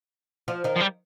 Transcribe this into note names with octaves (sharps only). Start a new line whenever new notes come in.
F3 F4
D#3 D#4
F3
G3